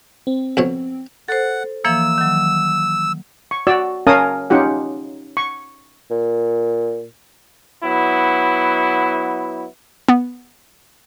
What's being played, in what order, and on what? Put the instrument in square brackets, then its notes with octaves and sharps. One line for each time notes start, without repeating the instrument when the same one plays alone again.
[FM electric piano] C4
[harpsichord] F2 B2 C#5
[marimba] A4 C5 [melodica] F#5
[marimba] E3 F3 A#3 [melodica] E6
[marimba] D#3 F#3
[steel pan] C#6
F#4 D5 E6
C#4 A#4 F5 G#5 A5 D#6
C#4 D#4 F4 G4 F#5
C#6
[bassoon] A#2
[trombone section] F#3 B3 E4
[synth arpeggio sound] B3